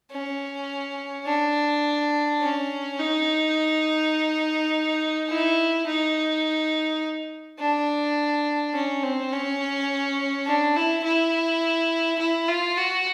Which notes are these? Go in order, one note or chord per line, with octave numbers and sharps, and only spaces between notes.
C#4
D4
C#4
D#4
E4
D#4
D4
C#4
C4
C#4
D4
E4
E4
E4
F4
F#4